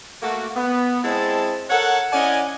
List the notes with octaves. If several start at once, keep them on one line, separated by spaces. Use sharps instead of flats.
A3 A#3 F#4
B3
G#3 C4 E4 D#5 A5
A4 A#4 C#5 F#5
C#4 E4 D5 D#5 F#5 G#5